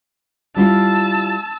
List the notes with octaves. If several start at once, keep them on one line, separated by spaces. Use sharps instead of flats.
G3 E4 F4 A5 E6